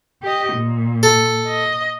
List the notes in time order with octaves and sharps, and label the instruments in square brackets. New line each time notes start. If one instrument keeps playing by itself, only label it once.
[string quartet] G4 D#5
A#2
[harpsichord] A4
[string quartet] D#5